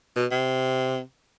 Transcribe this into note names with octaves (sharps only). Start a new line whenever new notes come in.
B2
C3